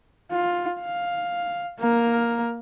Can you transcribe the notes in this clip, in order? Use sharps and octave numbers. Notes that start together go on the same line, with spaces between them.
F4
F5
A#3 A#4